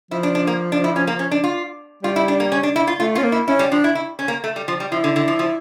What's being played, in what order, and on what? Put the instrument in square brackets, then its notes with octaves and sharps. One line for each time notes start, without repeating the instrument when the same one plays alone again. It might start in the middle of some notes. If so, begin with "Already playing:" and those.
[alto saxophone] F3 [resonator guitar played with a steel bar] E4
[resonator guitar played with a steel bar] D4
D4
A#3
D4
E4
C#4
A#3
C#4
D4
F4
[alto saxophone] G3 [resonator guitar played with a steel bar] F4
[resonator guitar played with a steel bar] E4
D4
A#3
C#4
D4
E4
F4
[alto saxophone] A3 [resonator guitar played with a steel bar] F4
[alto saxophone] C#4 [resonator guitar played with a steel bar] F4
[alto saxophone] A#3
[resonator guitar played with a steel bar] E4
[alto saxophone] C#4 [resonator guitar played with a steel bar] E4
[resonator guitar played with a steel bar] G3
[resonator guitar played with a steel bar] F3 [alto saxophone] D4
[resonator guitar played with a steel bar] E4
E4
C#4
A#3
A3
G3
F3
G3
[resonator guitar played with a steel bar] F3 [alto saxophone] E4
[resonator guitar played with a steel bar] D3
D3
F3
F3